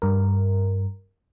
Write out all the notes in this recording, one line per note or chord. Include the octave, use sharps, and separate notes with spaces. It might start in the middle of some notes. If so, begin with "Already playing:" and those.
G2 A#4